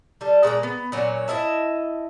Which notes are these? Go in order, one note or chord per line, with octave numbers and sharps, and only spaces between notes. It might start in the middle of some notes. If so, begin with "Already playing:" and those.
G3 A4
A#2 G#3 D5 A#5
B3
A#2 F#3 C#4
E4 D#5 E5 A5